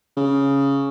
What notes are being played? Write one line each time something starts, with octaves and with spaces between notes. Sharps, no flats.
C#3